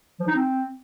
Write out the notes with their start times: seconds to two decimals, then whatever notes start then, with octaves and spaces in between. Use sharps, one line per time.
0.19 F3
0.27 D#4
0.35 C4